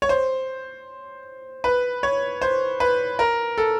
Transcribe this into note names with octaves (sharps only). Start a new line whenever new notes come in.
C#5
C5
B4
C#5
C5
B4
A#4
A4